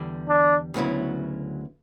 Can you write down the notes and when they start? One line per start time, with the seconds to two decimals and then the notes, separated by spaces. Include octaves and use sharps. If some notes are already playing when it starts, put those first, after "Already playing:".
Already playing: E2 D3 G3
0.29 D4
0.74 D2 C#3 F#3 B3 E4